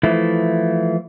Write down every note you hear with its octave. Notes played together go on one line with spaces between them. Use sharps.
E3 F3 A3 E4